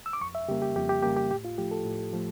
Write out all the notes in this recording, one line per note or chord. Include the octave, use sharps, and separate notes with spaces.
E6
D6
F2 C#6
E5
C#3 G3 A#3 G4
G4
F2 G4
G4
C#3 G3 A#3 G4
G4
A2 G4
F4
F3 A3 G4
A4
A2
F3 A3